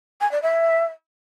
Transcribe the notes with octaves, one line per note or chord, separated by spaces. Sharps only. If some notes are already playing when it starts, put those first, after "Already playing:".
G#5
D5
E5